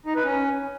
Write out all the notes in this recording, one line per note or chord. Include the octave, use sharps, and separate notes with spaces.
D#4
B4
C#4